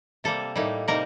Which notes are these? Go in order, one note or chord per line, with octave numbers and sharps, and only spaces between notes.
C3 G3 A#3 A4
A2 G3 A#3 D#4
C3 G3 A#3 D#4 A#4